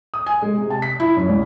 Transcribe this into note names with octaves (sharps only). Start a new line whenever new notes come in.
D#6
G#5
G#3
C3
A5
B6
E4
F#2
C2